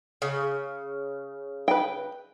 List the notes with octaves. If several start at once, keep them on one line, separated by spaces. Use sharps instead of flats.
C#3
B4 G5